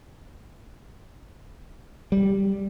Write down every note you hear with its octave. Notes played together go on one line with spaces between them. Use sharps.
G3